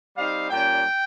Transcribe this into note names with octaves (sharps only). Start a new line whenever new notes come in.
G3 C4 D#4 F5
A#2 G3 C#4 G5